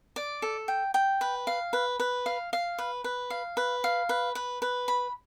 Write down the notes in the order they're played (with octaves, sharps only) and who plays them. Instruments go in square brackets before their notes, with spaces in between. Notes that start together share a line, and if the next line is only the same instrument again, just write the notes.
[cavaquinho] D5
A4
G5
G5
B4
F5
B4
B4
F5
F5
B4
B4
F5
B4
F5
B4
B4
B4
B5